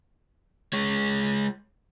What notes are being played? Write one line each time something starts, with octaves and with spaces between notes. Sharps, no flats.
G#3 C#5